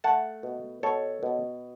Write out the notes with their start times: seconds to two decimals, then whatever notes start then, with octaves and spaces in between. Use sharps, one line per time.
0.04 A3 F#5 A5
0.43 B2
0.83 B2 A4 C#5
1.23 B2